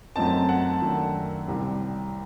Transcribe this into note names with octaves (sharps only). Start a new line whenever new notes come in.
F#2 F#3 A3 C4 D#4 A5
F#5
F#2 D#3 A3 D4
C2 C3 G3